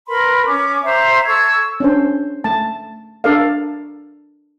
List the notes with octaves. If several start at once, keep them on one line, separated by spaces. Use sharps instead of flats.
A#4 B4 B5 C6
C#4 D6
C5 E5 A#5 C6
A4 C#6 E6 G#6
C#4 D4 C5
A3 A5
D4 A4 A#4 D5 F5